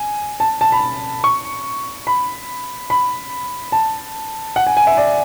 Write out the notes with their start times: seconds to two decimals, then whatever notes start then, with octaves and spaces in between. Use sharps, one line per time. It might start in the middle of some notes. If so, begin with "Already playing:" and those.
Already playing: G#5
0.40 A5
0.61 A5
0.72 B5
1.24 C#6
2.07 B5
2.90 B5
3.72 A5
4.56 F#5
4.67 G#5
4.77 G#5
4.87 E5
4.97 D5